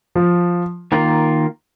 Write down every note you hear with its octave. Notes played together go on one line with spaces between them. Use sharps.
F3
D#3 A#3 F4 A#4